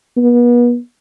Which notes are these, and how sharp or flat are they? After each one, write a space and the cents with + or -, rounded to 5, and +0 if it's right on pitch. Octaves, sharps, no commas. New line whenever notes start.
B3 -35